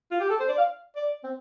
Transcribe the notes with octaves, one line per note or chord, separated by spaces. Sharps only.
F4
G4
A4
C5
D5
F5
D5
C4